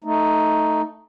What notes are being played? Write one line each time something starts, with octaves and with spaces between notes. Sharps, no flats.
A3 D#4